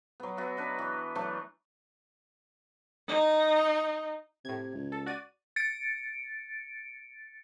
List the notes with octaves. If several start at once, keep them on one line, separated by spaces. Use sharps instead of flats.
F#3 B3
B3 F#4 E5
D4 B4 D#5
E3
E3 F#3 A3 D4
D#4
A2 C3 G#6
C#2
A4
F#4 D5 D#7
A6 C#7 D7